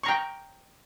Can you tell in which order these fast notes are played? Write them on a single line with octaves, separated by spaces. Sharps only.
C#6 A#5 G5